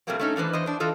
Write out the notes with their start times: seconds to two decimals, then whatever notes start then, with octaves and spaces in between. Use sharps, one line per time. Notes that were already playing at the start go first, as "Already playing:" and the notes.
0.07 C3 F#3 G3 A3 A#3 C4
0.19 A3 C#4 D#4
0.36 D#3 E3 D4 B4 C5
0.53 E2 C5 D#5
0.66 D4 C5
0.80 E3 F4 A4 D#5